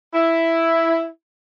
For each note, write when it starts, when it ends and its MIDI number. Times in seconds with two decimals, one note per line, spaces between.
0.13 1.06 64